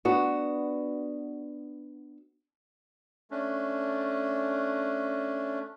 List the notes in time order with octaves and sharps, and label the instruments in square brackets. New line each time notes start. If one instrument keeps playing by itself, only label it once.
[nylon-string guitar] B3 D4 F#4
[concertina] A3 C#4 D4